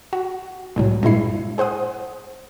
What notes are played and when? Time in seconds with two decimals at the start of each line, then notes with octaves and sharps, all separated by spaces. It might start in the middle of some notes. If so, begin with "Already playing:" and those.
0.13 F#4
0.76 C2 A2 F#3
1.03 G2 A#2 G#3 E4 C7
1.58 G#4 C5 F#5 D#6